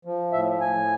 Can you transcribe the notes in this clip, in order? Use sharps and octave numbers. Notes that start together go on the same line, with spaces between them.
F3
A2 E5
A2 G#5